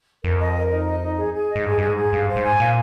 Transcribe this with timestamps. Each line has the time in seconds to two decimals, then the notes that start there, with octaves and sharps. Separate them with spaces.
0.24 F2 A#4
0.39 D#5
0.55 A#4
0.71 D#4
0.86 D#5
1.02 D#4
1.18 G#4
1.34 G#4
1.50 D#5
1.55 G#2
1.65 G2 G#4
1.78 G2 G#4
1.89 G#2
1.97 G#4
2.13 G2 F5
2.28 C5
2.36 G#2
2.43 G#5
2.59 A#2 F5